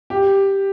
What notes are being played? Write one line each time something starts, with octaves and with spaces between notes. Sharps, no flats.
G4